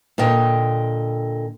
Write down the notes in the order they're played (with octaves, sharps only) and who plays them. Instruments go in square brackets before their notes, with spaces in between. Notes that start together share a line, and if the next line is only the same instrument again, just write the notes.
[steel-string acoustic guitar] A#2 D3 D#5 G5